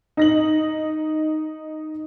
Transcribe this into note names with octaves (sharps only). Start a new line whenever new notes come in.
D#4 A#6 F#7